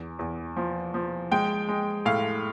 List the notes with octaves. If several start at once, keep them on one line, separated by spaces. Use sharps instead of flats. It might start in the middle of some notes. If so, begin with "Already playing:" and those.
Already playing: E2
E2
F3
F3
G#3 G5
G#3
A2 F5